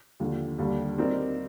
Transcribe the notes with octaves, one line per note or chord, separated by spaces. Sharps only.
D#2 D3 F3
D#2 D3 G3 D4
G3 C4 D#4 A#4 D5